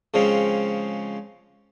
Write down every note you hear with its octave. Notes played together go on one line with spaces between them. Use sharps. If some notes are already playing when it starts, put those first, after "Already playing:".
C#3 F3 G#3 C4 C#4